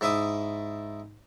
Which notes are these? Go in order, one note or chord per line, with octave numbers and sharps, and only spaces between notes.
G#2 E4 E5 D6 D#6